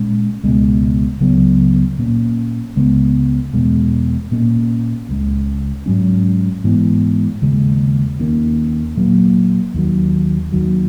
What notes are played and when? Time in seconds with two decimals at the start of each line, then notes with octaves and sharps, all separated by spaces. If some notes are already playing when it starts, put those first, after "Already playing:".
Already playing: A#2 G#3 C#4
0.44 C#2 B2 G#3
1.21 C#2 C#3 F#3 B3
1.99 A#2 A#3 C#4
2.76 C#2 C#3 G#3 B3
3.53 E2 B2 G#3
4.31 A#2 A#3 C#4
5.09 C#2 C#3 G#3
5.86 G#2 F#3 C#4
6.64 G#2 E3 B3
7.42 D#2 C#3 G#3
8.19 D#2 D#3 A#3 C#4
8.97 A#2 F#3 A#3
9.74 D#2 D#3 F#3
10.52 D#2 D#3 F#3